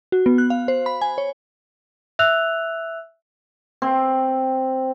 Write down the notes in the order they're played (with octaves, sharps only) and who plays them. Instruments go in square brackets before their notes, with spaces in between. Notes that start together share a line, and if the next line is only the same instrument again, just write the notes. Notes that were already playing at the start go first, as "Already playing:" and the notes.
[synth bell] F#4
B3
F#6
F5
C5
B5
G#5
C#5
[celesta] E5 E6 F#6 F7
[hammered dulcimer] C4